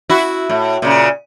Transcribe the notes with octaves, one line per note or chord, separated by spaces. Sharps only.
E4 F#4
A2
A#2 C#3